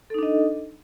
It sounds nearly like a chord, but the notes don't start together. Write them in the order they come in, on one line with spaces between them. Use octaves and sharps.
A4 D#4 D4 D#5